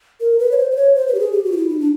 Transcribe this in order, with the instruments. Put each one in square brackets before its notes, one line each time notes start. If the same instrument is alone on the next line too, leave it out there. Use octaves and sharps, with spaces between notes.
[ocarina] A#4
B4
C#5
C5
C5
C#5
C5
B4
G4
G#4
G4
F#4
F4
E4
D#4
D4